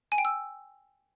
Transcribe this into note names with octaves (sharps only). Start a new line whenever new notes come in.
G#5
G5
E6